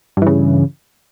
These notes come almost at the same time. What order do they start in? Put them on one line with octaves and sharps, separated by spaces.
G2 E3 C#3